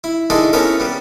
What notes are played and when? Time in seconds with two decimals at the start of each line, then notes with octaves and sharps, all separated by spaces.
0.04 E4
0.30 D#3 G#3 D4 E4 A4
0.53 B3 C#4 E4 A4 A#4
0.80 G3 B3